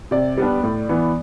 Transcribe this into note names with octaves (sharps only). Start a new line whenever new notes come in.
C3 D5
G3 B3 D4
A2
E3 B3